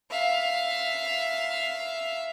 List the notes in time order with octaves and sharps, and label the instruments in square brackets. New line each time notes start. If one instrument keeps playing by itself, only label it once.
[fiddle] E5 F5